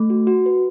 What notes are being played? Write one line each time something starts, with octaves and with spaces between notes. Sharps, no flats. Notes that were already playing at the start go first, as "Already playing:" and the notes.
Already playing: A3
F#4
F#4
B4